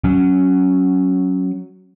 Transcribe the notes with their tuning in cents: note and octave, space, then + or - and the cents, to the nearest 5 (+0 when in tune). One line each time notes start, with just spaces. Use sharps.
F#3 +5 C#4 +0